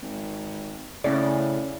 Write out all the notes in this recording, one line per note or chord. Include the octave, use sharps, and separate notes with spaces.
G#1
A2 C#3 C#4 D5